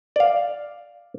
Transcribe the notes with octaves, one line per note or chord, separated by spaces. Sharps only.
D5 F5